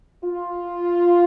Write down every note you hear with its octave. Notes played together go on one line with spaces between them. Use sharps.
F4